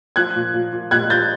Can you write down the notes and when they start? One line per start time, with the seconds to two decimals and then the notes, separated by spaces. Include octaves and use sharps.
0.16 F3 F#6 G#6
0.36 A#2
0.54 A#2
0.73 A#2
0.91 A#2 F#6 G#6
1.10 A#2 G6 A6